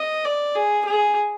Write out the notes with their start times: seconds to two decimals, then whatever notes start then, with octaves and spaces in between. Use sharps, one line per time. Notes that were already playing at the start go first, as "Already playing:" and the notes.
Already playing: D#5
0.25 D5
0.55 G#4
0.85 G#4